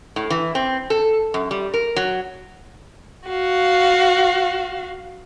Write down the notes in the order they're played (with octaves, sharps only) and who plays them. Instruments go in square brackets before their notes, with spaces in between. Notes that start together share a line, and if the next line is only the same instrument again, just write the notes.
[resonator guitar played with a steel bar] A2
E3
C4
A4
F#2
G3
A#4
F#3
[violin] F#4 F5